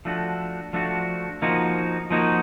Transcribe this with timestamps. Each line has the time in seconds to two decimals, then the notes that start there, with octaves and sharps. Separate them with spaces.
0.05 F3 A3 D4 F#4
0.73 F3 A3 D4 F#4
1.42 F3 A#3 D#4 F#4
2.10 F3 A#3 D#4 F#4